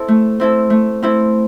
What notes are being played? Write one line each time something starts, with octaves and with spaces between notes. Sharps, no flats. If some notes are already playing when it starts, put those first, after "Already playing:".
Already playing: C4 E4 A4
A3
C4 E4 A4
A3
C4 E4 A4